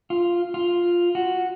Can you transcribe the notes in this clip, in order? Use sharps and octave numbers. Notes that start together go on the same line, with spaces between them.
F4
F4
F#4